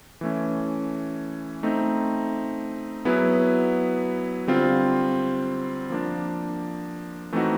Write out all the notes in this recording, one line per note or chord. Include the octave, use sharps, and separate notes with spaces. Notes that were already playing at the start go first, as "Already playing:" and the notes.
E3 A3 C#4
A3 C4 D#4
F#3 B3 E4 G#4 B4
D3 G3 C4 F4
F3 A#3 D4
E3 A3 C4 D#4 F#4